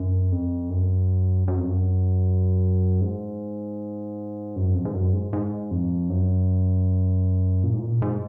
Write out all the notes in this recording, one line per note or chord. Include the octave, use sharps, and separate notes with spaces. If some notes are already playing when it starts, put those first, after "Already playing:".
Already playing: F#2
F2
F#2
F#2
F2
F#2
G#2
F#2
F2
G#2
F#2
G#2
G#2
F2
F#2
A#2
G#2
A#2
G#2